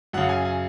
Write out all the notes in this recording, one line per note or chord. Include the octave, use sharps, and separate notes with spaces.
F#2 C#3 F#5
G#5
G#5